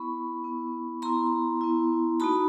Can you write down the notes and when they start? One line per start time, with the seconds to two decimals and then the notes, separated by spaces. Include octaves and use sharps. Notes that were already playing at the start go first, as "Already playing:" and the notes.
Already playing: B3 E4 B5 C#6
0.44 B3 E4
1.02 B3 E4 A#5 C6
1.61 B3 E4
2.20 A#3 D#4 F#4 A5 B5